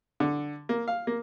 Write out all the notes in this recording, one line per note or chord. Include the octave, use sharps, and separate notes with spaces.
D3
A#3
F5
A#3